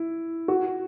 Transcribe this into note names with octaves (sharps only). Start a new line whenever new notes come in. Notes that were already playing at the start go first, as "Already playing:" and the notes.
Already playing: E4
F#4